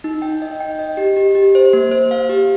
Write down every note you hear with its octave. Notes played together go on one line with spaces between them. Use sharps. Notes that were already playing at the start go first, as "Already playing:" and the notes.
D#4
G5
D#5
G5
D#5
G4
G4
G4
C5
A#3
C5
F5
G4